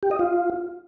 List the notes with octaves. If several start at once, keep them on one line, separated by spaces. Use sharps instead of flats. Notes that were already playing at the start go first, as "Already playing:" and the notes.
G4
D#5
F4